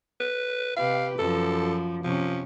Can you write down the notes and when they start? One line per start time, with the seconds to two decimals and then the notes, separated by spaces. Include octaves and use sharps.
0.20 B4
0.76 C3 G4 B4 F5
1.19 F#2 F3 A4
2.04 C3 F3 C#4